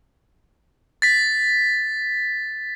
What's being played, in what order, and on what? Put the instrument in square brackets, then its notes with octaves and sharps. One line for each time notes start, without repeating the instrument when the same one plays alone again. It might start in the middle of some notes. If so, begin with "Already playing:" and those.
[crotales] A6 B6